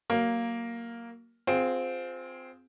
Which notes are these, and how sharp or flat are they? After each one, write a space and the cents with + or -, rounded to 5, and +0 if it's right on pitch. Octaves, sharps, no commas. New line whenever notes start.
F#3 +25 A#3 +0 A#4 +0
C4 -10 F4 +20 G#4 +0